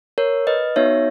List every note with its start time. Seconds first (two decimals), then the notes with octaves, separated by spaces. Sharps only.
0.18 A#4 C#5
0.47 B4 D#5
0.76 B3 D#4 F#4 C#5 E5